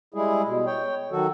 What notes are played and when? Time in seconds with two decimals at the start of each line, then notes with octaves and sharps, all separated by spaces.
0.14 G3 G#3 E4 G#4
0.45 B2
0.67 C#5 G5
1.12 D#3 F#3 F#4 A4